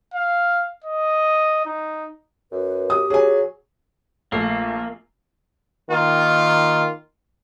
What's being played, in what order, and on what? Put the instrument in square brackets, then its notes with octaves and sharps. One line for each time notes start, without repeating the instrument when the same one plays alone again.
[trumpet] F5
D#5
D#4
[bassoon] F#2 [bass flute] B4
[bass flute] G4 [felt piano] D#6
[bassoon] F#3 [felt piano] G#4 G#5
[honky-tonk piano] A#1 A3 C7 [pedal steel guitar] A#3
[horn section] D#3 A#3 F4